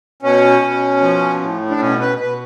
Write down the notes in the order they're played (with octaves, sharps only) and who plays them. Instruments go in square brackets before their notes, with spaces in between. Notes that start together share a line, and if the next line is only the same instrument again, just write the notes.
[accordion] B2 C#4
B2
F3
A2
D4
B2 C#4
B4
B2 B4